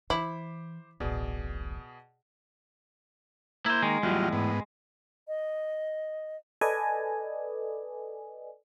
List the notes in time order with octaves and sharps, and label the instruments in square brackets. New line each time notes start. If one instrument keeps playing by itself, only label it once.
[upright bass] E3 [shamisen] E4 [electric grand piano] C5 D6 B6
[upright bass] D1 A1 [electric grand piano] B2 G#4 D5
[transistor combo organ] A#3 [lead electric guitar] E4 C5
[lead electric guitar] D#3 [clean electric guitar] G#3
[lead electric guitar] E2 A2 [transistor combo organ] F#3 G3 F4
[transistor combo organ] G#2 B3
[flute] D#5
[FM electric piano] A4 B4 D5 D#5 G#5